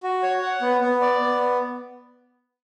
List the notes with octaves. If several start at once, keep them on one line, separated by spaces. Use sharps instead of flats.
F#4
C#5
F#5
B3
B3
D5
B3